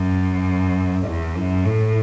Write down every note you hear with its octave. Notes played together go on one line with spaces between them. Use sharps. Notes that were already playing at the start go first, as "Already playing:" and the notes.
Already playing: F#2
E2
F#2
A2